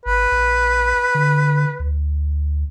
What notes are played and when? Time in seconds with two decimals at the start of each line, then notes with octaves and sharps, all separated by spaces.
0.06 G#1 B4
0.32 A#1
1.15 D3
1.79 D2